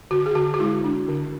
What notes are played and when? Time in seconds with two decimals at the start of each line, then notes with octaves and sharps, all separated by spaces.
0.11 D3 F#4
0.26 G#4
0.35 D3 F#4
0.54 F#4
0.60 G#3 E4
0.84 D4
1.08 D3